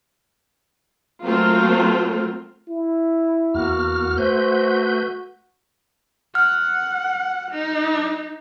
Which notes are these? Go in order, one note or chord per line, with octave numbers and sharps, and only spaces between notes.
F#3 A3 A#3 C4 F4 A#4
E4
E2 A#3 F#4 F6
A3 B4 C5 G6
F#5 F6
D#4